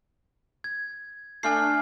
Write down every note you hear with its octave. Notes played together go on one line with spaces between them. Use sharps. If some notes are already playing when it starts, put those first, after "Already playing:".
G#6
A3 D4 G#5 F6 C7